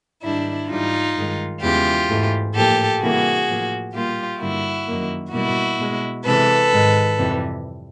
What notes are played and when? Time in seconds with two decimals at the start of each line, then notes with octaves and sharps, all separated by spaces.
0.22 G#2 D#3 G3 D4 E4
0.69 G#2 E3 G3 D#4 F4
1.16 G2 D#3 G#3
1.61 E2 C#3 E3 G#3 F4 G4
2.09 G#2 E3 A3
2.54 A2 F3 A#3 G4 A4
3.01 C3 E3 G3 A#3 F#4 G#4
3.47 A2 F3 A#3
3.94 A#2 G3 A#3 F4 G4
4.40 G2 D3 G3 A#3 E4 F#4
4.87 F#2 D#3 F#3 A#3
5.33 B2 G3 A#3 E4 F#4
5.79 B2 G#3
6.25 C3 E3 G#3 A4 B4
6.72 G#2 D#3 G#3
7.18 F2 C3 E3 G3